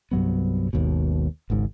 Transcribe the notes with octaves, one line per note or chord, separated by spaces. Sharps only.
C2 G2 F#3 B3
G#1 D#2 G#2 B2
G#1 C#2 G#2